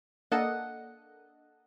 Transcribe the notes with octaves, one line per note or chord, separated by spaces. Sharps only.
A#3 D4 A4 D#5 F#5